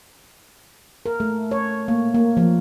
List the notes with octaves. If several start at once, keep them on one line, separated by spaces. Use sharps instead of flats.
A#4
A3
C#5
A#3
A#3
F3